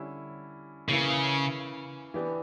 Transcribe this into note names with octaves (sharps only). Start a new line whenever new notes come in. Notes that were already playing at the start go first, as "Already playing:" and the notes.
Already playing: D3 G3 C#4 E4
C#3 E3 A#3 C#4 E4
E3 B3 D4 G4